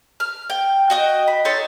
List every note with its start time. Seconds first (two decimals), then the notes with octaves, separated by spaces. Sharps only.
0.20 F6
0.50 G5
0.90 F#4 D#5 G5
1.28 B5
1.45 D#4 A4 C#5 C6